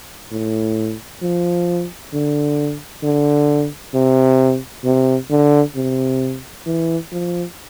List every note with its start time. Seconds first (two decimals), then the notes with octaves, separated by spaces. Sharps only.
0.31 A2
1.22 F3
2.13 D3
3.03 D3
3.94 C3
4.84 C3
5.30 D3
5.75 C3
6.66 E3
7.12 F3